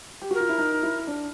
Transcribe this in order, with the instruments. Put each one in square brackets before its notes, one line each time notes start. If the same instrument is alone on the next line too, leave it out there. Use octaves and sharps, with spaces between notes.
[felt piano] G4
[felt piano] F#4 [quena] A#4
[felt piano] F4
E4
D#4
E4
D4